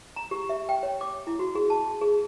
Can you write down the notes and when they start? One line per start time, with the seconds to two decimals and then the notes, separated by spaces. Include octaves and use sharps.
0.16 A#5
0.31 G4
0.49 E5
0.69 G5
0.83 C#5
1.01 D6
1.27 E4
1.39 F#4
1.55 G#4
1.70 A5
2.01 G#4